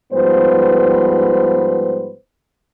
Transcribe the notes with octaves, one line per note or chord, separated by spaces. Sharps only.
G#2 F3 G3 B3 B4 C5